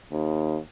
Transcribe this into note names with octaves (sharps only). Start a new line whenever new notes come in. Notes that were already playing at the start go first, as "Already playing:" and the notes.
D#2